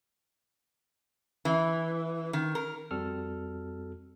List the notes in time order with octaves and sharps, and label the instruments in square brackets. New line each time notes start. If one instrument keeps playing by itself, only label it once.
[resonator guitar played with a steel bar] E3
D#3
A#4
[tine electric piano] F2 G3 C4 F#4 A4 F6